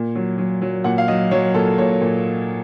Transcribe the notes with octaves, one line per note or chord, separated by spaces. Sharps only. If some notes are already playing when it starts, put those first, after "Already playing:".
Already playing: A#2
F#3
F#3
F#3
A#2 F#5
F5
F#3 D#5
F#3 C#5
A#2 A4
A#2 C#5
A#2